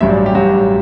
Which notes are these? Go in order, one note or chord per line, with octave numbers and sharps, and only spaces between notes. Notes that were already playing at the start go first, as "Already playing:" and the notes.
A1 G2 F#3 E5
D5
C#5
G4
A1 G2 F#3 F#4